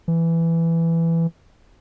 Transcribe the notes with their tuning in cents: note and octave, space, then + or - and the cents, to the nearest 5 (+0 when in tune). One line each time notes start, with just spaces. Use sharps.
E3 +10